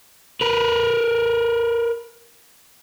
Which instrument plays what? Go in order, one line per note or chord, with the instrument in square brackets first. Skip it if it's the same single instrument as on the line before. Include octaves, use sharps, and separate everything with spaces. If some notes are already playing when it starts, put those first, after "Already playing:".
[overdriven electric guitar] A#4 B4